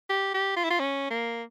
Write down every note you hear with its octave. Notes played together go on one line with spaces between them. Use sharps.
G4
G4
F4
E4
F4
C#4
A#3